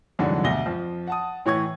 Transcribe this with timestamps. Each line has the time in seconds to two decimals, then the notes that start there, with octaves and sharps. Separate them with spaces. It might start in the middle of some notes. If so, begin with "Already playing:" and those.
0.19 C2 F2 G#2 D3 E3 F#3
0.44 D2 B2 E5 A#6 G7
0.66 F2 F3
1.07 F#5 A5 D#6
1.46 A2 E3 C#5 C#6 G#6